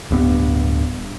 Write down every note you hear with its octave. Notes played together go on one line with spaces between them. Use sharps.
D1 G2 B3